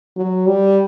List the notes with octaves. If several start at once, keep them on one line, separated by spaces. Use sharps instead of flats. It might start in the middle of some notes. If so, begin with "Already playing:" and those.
F#3
G3